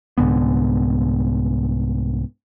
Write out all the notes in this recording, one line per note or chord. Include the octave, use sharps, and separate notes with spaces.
C2 G#2 D3 B3